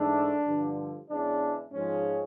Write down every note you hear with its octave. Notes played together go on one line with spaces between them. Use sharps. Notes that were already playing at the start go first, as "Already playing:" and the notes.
Already playing: G#2 E3 A3 D4
G2 D3 F3
E2 C#3 E3 G#3 D4
G#2 F3 G#3 C#4